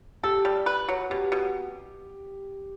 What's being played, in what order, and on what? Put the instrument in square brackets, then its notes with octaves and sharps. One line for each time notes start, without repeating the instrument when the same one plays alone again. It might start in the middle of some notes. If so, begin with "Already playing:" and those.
[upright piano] G4 [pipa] A4
[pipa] G3
B4
F#3
[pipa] B2 [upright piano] G4
[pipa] B2